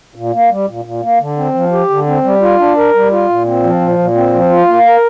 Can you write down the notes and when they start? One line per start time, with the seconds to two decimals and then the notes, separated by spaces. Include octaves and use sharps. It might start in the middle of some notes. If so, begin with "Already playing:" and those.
0.15 A#2
0.33 A#3
0.50 G3
0.68 A#2
0.85 A#2
1.03 A#3
1.20 D3
1.37 C4
1.54 F3
1.72 G4
1.90 D3
2.06 C4
2.24 G3
2.42 F4
2.59 D4
2.77 A#4
2.94 G3
3.11 F4
3.29 A#2
3.46 C4
3.64 F3
3.81 A#2
3.98 A#2
4.15 C4
4.34 F3
4.50 F4
4.67 A#3
4.85 A#4